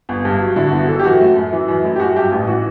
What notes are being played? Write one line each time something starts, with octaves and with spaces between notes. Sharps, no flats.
G1
G2
F#3
D3 E4
F#4
G1
F#4
E3 A4
G4
F#2 F#4
A3
F#2
E3
F#2
A3 E4
G4
F#2 F#4
G2 G4
A1
E3 F#4